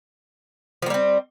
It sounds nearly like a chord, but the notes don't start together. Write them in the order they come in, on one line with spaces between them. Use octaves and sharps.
F3 A#3 G3 C4